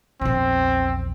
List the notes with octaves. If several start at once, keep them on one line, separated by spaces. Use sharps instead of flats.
A#1 E2 C4